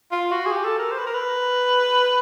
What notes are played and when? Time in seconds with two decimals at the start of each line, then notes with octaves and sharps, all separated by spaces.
0.12 F4
0.31 F#4
0.46 G#4
0.52 G4
0.64 A4
0.79 A#4
0.92 C5
0.99 B4
1.06 A#4
1.14 B4